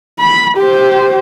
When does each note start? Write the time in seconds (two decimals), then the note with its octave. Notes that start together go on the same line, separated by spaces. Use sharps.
0.19 B5
0.58 G4 C5